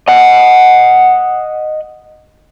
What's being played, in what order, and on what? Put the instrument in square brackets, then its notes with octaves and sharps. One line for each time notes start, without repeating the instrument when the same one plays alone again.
[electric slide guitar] D#5 F#5